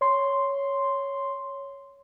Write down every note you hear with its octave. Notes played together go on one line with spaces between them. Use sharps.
C#5 C6